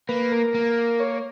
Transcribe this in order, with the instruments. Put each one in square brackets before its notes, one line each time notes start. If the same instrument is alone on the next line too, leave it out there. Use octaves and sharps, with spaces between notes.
[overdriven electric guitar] A#3 [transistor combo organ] B4
[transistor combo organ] A#4
[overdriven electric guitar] A#3
[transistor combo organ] C#5